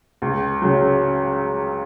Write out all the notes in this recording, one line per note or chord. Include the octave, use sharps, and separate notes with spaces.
C#2
C#3 F#3